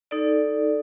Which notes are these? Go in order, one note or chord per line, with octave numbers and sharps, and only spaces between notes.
D#4 A4 D5